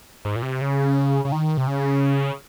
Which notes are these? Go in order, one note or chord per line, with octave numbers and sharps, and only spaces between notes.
G#2
A#2
C3
C#3
C#3
D#3
C3
C#3